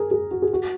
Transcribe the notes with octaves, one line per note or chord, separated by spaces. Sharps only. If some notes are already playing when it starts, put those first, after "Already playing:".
Already playing: G#4 A#4
G#4
F#4
G#4
F#4